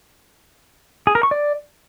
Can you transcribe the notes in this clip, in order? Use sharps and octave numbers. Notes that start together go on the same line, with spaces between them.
G#4
A#4
C#6
D5